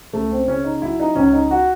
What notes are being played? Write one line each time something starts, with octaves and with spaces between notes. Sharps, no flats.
C#2 A3
C4
C#3 C#4
D#4
F#3 E4
D#4
C#2 C#4
D#4
F#4